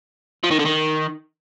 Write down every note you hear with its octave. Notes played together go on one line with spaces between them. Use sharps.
F3
D#3
D3
D#3